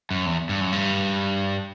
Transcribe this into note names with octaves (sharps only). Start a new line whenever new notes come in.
F#2
E2
G2
F#2
G2